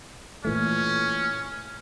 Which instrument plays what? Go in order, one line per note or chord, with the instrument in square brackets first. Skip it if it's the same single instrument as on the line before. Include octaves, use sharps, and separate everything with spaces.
[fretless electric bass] A#2 E3 A3 [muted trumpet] C#4